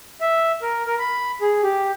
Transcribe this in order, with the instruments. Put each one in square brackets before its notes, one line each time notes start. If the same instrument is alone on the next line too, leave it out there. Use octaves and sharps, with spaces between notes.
[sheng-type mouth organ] E5
A#4
A#4
B5
G#4
G4